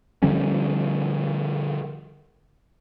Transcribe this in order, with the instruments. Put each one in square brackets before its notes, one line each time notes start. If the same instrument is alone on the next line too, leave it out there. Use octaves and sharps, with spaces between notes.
[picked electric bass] D3 F3 G3 C#4